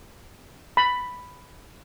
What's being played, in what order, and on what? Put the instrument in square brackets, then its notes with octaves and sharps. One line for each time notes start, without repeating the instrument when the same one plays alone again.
[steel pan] B5